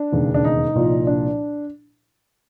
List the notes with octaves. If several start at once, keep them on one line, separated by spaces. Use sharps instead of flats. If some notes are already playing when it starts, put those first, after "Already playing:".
Already playing: D4
E1 D#2 C#3
D4
D#4
C2 A#2 F3
D4